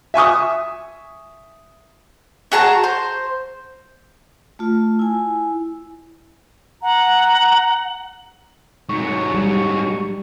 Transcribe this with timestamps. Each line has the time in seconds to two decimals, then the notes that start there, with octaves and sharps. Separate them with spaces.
0.14 E5 G#5 C#6 D#6
2.52 F#4 G#4 A5 A#5
2.84 C5
4.59 A3 F4
4.99 E4 G#5
6.82 F#5 A#5
8.89 G#2 F#3 C#6
9.34 G3